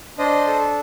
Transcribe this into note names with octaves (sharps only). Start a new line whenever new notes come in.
D4 C5 D#5
A4